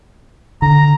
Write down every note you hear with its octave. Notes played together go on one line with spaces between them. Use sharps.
D3 A#5